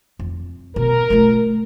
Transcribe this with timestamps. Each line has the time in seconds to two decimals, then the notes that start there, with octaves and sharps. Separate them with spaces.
0.19 F2
0.76 B2 A#4
1.10 A3 F4